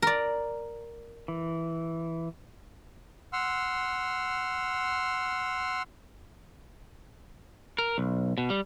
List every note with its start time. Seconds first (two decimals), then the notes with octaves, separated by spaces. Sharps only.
0.02 A#4 D5
1.28 E3
3.33 F#5 C6 E6 F6
7.78 A#4
7.98 B1
8.38 B2
8.50 G3